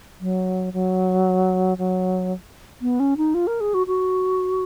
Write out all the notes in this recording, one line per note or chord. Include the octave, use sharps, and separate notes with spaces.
F#3
F#3
F#3
B3
C#4
D#4
F4
A#4
G#4
F#4
F#4